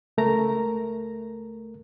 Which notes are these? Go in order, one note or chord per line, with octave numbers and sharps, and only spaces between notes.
C#2 A3 A#4 A#5